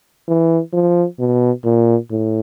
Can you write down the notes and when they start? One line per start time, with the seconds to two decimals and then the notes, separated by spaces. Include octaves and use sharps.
0.28 E3
0.73 F3
1.20 B2
1.65 A#2
2.11 A2